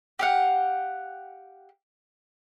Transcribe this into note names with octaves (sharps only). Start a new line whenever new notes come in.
G4 F5 F#5